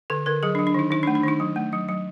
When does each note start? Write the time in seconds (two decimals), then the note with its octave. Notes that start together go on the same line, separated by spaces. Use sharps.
0.10 D3 A4
0.26 D3 A#4
0.43 F#3 G#4
0.55 D4
0.59 F#3
0.67 D4
0.74 D#3 D#4
0.91 D#3 D#4
1.03 D4
1.07 A3
1.15 D4
1.24 D#3 D#4
1.40 F#3
1.56 A3
1.73 F#3
1.89 F#3